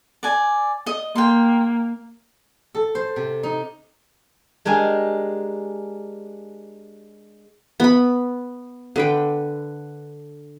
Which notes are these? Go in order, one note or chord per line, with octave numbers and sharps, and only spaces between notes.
D5 G#5
D#5
A#3 G5 C6
A4
C5
C3
D#4
G#3 D4 G4 A#4 G#5
B3 B5
D3 B4 G5